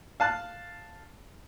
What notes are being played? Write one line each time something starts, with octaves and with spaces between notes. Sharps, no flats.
F5 A5 F#6